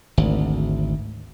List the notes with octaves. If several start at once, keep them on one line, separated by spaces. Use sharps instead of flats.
G#1 D2